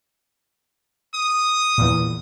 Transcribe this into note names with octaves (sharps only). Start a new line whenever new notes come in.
D#6
E2 A#2